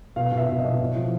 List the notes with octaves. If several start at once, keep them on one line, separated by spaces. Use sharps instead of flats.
B2 F5
B2
E5
B2
D#5
B2
A2
F3